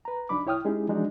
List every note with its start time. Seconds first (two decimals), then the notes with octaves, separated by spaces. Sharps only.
0.05 B4 A#5
0.29 C#2 F#3 D4 D#4 B5 D6
0.46 C2 E4 C#5 G5 D#6 F6
0.65 G#3 C#4 D#4 E4 G4 G#4
0.88 E3 F3 G#3 D4 D#4 F#4